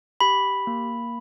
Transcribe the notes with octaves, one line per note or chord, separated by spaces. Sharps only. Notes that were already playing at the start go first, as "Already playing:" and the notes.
G4 B5
A#3